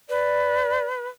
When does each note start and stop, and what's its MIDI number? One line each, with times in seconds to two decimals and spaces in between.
0.09 1.08 71
0.09 0.85 74